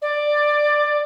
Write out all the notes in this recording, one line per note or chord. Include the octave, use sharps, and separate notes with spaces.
D5